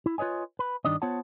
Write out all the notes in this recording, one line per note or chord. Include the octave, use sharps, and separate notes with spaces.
E4
F4 B4 C#5 D#5 G#5
B4
G2 D#3 G3 D4 D5 D#5
B3 F4 C5 C#5 F#5 A5